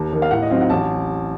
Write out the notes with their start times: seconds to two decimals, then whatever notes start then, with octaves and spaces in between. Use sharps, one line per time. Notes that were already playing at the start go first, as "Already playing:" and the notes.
Already playing: D#2 A5
0.13 D#3 A#3
0.22 F5
0.31 A2 F#5
0.42 D#5
0.51 F#3 C4 D#4 F5
0.61 F#5
0.70 A1 A5